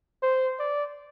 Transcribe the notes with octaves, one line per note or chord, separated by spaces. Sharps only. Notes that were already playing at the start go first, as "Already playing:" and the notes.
C5
D5